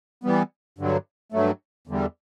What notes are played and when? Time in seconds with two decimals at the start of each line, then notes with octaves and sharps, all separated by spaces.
0.24 E3 G3 B3
0.78 G2 D3 F#3
1.32 G2 F#3 A3
1.88 E2 D3 G3